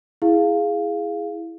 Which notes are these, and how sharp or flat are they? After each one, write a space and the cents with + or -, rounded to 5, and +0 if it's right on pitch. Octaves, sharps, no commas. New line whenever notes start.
E4 +0 G#4 +0 F5 +0